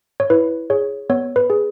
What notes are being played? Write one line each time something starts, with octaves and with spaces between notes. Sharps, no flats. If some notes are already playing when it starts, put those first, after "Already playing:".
C#5
E4 B4
G#4 C#5
B3 C#5
B4
G#4